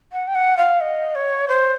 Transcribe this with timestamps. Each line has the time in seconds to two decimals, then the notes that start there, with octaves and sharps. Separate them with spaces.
0.13 F#5
0.28 G5
0.35 F#5
0.57 F5
0.81 D#5
1.15 C#5
1.48 C5